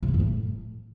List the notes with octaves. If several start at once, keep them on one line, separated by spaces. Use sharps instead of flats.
C3
G#3
F#2
A2